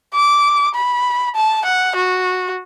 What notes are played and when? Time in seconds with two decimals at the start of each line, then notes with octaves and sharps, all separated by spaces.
0.14 D6
0.74 B5
1.36 A5
1.65 F#5
1.96 F#4